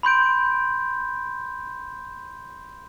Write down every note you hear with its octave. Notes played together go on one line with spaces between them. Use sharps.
B5 C6 G6 D7